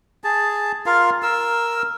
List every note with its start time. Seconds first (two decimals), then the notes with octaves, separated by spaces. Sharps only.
0.24 G#4 A5
0.86 F4 A#4 F5
1.23 A#4 E6